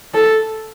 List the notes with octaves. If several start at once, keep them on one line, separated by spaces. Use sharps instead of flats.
A4